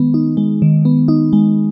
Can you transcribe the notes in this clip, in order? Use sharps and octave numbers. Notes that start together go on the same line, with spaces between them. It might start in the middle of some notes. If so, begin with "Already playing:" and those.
Already playing: D#3 G#3 B3
D#4
G#3
D#3
B3
D#4
G#3